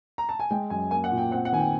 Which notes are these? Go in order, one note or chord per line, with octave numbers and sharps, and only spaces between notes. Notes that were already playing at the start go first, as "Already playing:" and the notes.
A#5
A5
G#5
G#3 G5
F#2 G#5
A#3 G#5
F#5
A#2
G5
C4 F#5
F#5
D#3 G#5
G5